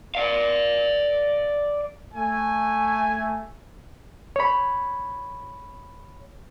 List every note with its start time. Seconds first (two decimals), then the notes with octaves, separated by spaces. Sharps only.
0.15 D5 F5
2.14 A3 G#5
4.36 C#5 B5